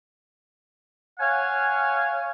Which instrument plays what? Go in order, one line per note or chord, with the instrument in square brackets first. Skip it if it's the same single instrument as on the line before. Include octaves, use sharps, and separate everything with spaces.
[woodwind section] C#5 F5 F#5 G#5